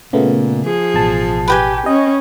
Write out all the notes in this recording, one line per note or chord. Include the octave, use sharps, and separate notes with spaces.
A#2 C#3 A3 B3
F3 G#4
A1 B2 A5
G4 B4 G5 G#5
C#4 D#5